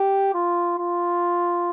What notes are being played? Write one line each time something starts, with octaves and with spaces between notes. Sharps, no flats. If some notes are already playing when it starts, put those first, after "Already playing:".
Already playing: G4
F4
F4